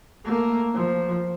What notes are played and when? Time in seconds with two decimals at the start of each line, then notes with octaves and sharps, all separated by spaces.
0.25 A3 A#3
0.74 F3